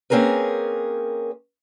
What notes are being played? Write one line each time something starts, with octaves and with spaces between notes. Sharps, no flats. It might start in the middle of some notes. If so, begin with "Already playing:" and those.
A#3 C4 C#4 G#4 A#4 B4